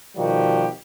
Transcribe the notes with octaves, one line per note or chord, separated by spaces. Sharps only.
B2 D#3 F3 G3 F#4 G4